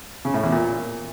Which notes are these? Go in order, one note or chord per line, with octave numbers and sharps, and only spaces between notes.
C#3
A2
E2
A#2